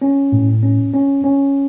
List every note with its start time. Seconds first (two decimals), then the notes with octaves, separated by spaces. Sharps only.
0.02 C#4
0.32 A2
0.63 C#4
0.94 C#4
1.24 C#4